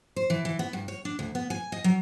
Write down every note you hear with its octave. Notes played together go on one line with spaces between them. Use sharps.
C5
E3
E3
B3
G2
C#5
D4
D2
B3
G#5
D#5
F#3